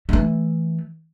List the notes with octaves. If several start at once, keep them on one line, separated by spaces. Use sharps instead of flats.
E3 A3